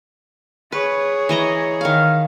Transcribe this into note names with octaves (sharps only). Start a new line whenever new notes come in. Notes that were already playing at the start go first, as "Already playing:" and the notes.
G#4 B4 C#5
E3 D#5 A#5
D#3 F5